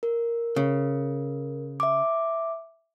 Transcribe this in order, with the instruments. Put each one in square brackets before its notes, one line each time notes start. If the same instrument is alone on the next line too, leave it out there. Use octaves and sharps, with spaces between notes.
[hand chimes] A#4
[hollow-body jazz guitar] C#3
[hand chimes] E5 D6